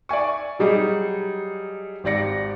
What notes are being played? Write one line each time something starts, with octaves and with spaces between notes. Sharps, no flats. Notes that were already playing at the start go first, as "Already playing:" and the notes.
D5 E5 G#5 C#6
F#3 G3 D#4 G#4
G#1 G4 D5 A#6 C#7